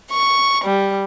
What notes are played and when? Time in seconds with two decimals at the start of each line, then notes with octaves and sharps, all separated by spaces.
0.10 C#6
0.64 G3